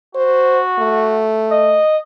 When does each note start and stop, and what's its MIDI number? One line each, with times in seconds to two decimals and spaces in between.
0.15 1.30 66
0.15 0.60 72
0.79 1.81 57
1.52 1.97 75